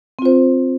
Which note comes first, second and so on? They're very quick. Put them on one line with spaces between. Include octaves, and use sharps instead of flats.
C4 F4 C5